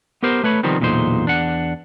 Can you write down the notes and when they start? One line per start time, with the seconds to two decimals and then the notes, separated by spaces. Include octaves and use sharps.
0.23 B3 G4 A#4 C5
0.43 A3 B4 C#5 B5
0.63 C3 D#3 F3 G3 B3 C4
0.80 B1 E2 A#2 D3 D#4 C5
1.25 E2 D4 F#5